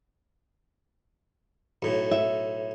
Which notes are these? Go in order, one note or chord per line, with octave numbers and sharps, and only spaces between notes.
B1 A2
E5